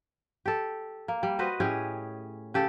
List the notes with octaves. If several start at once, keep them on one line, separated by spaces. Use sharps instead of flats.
G4 A4
A#3
G3
F#4 B4 C5 D#5
A2 C#4 G4 G#4
C#3 G4 A4